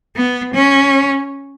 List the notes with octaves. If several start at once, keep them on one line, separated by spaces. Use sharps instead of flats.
B3
C#4